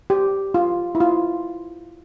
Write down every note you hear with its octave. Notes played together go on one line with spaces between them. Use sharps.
G4
F4
E4
F4